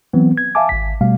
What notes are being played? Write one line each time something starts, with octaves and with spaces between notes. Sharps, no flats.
E3 F#3 B3 C4
G#6
E5 F5 G#5 A5 D6
G#1 B6
B2 G3 A3 F5